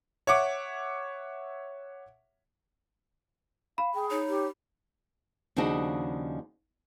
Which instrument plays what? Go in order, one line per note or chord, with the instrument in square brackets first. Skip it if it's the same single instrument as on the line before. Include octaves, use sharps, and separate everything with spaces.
[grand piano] C#5 E5 F#5 D6
[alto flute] F5 [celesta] B5
[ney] G#4 [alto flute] G5
[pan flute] D#4 [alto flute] C#5
[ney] G4
[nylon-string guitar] D#2 C#3 F3 D4 F#4 D#5